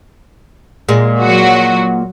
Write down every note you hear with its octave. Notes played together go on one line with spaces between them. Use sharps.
A#2 G#3
F#3 F#4